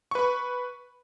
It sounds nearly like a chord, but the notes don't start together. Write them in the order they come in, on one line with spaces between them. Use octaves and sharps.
C#6 B4 B5